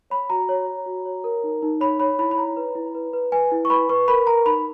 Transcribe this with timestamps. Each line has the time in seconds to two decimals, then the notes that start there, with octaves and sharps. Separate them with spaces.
0.10 C#5 B5
0.30 F#4 A#5
0.49 C#5
0.67 C#5
0.86 F#4
1.05 C#5
1.24 A#4
1.43 D#4
1.62 D#4
1.81 C#5 B5
2.00 C#5 B5
2.19 E4 B5
2.31 B5
2.38 C#5 A#5
2.57 B4
2.75 E4
2.95 B4
3.13 B4
3.32 B4 G#5
3.51 E4
3.65 C#6
3.70 B4 B5
3.89 B4 C#6
4.08 A#4 B5
4.27 A#4 A#5
4.46 D#4 B5